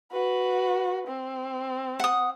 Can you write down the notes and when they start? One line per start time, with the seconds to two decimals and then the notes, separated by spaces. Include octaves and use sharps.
0.12 F#4 B4
1.08 C4
1.99 F#5 D#6